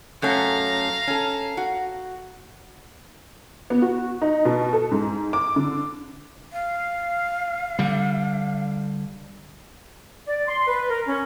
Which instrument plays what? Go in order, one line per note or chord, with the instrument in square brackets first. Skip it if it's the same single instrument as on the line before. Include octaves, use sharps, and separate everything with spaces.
[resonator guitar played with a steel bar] F#2 A3 C#4 [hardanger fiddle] F5 A#5
[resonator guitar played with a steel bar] C#4 A4
F#4
[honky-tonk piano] B3
F#4
D#4
B2
A4
G#2
D6
D3
[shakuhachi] F5
[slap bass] D3 G3
[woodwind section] D5
C6
B4
A#4
C#4